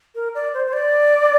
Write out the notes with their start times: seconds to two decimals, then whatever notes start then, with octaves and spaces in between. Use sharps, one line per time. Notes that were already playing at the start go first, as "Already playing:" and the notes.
0.15 A#4
0.35 D5
0.54 C5
0.67 C5
0.73 D5